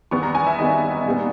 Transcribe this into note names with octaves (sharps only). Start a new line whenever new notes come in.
E2 D#3 G3 B3 C#6
A#5
G#5
E5
E2 D#3 G3 B3 D#5
A#2 G3 B3